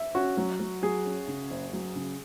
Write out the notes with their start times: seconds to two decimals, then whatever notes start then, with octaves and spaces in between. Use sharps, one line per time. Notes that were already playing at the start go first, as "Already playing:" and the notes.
Already playing: E5
0.15 C#4 F#4
0.37 F#3
0.60 F#3
0.82 F#3 G#4
1.05 C#4
1.28 C#3
1.51 F#1
1.73 F#3
1.95 C#3